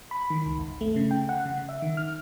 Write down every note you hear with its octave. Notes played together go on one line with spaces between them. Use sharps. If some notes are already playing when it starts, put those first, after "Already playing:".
B5
D#3
C#2
G1
A3
C#3
G5
F#5
C#3
E5
D#3
F6